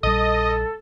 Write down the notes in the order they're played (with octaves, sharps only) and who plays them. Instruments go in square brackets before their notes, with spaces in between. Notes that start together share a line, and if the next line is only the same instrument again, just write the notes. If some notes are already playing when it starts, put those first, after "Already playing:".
[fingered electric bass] A#1 G3 [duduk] A4 [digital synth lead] D#5